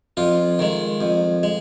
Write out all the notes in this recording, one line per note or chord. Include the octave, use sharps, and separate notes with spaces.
F2 F4
D#3 G#3
F2
G#3